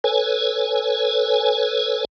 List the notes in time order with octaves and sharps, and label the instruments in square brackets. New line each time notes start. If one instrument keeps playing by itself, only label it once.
[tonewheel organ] A4 B4 C#5 G#5